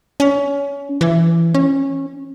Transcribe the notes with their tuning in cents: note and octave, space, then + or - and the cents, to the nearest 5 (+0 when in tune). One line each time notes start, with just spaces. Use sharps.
C#4 +25
E3 +20
C#4 -20